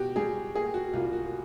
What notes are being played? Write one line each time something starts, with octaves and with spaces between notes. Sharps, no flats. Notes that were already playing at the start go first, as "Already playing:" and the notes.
Already playing: B2 F#4 G4
G3 G#4
A#3 G#4
F#4
C2 F4
F#4